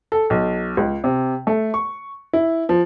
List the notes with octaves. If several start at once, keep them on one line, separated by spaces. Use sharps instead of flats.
A4
B1
C#2
C3
A3
C#6
E4
F3